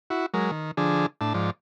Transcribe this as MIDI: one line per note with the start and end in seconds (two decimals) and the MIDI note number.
0.10 0.26 64
0.10 0.26 66
0.34 0.51 54
0.34 0.51 56
0.34 0.51 70
0.51 0.71 51
0.77 1.06 50
0.77 1.06 53
0.77 1.06 62
0.77 1.06 68
1.21 1.33 45
1.21 1.33 62
1.21 1.33 81
1.34 1.50 44
1.34 1.50 53
1.34 1.50 74